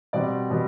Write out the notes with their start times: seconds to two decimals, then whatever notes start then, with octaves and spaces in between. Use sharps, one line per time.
0.13 B2 G3 C4 D5
0.50 B2 G3